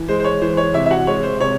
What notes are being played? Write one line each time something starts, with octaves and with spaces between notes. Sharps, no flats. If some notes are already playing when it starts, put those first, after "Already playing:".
Already playing: E3
G#3 C5
C5
C#5
E3 C5
C#5
C3 E4 E5
E5
F#4 F#5
G#3 C#5
C5
C3 C#5